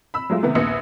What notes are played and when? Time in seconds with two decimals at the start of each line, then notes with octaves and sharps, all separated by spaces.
0.14 B5 E6
0.30 F#3 G#3 A3 F4
0.43 C3 D#3 A3 B3
0.55 A#1 D#2 B3 C#7